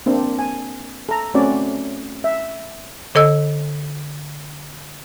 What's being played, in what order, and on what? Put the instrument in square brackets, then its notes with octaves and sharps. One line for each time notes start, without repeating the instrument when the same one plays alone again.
[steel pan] A#3 C4 D4
G#5
A4 A#5
A3 C4 C#4 F#4 C#5 D5
E5
[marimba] D3 A4 D#5 E6